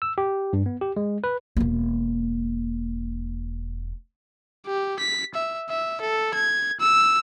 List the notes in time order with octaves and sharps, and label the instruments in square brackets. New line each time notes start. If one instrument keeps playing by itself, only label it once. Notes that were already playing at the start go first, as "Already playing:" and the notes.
[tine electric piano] E6
G4
G2
B3
G4
G#3
B4
[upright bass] E1 A#3
[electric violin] G4
B6
E5
E5
A4
G#6
E6